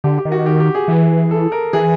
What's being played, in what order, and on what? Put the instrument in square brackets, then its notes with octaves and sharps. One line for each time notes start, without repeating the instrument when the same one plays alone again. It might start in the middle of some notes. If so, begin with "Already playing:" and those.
[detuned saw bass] D3 [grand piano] G4
[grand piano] G4
[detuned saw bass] D#3
[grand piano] F#4
G4
G4
G#4
[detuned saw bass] E3
[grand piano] A4
A#4
[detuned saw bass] E3 [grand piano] G#4